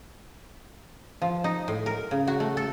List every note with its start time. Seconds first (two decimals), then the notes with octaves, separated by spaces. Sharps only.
1.22 F3
1.44 D#4
1.68 A2
1.86 A#4
2.11 C#3
2.27 F#4
2.40 A3
2.57 A4